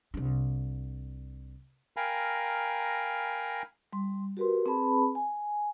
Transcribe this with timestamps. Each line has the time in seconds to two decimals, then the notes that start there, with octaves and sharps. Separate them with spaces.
0.14 C2 D4
1.97 A#4 F5 G5 G#5 A#5 B5
3.93 G3 C6
4.37 F#4 G4 A#4 B4 C6
4.66 C4 G#4 B4 A5 B5
5.15 G#5